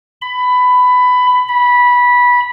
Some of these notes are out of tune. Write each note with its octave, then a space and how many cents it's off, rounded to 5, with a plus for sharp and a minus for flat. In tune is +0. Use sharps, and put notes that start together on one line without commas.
B5 +15
B5 -15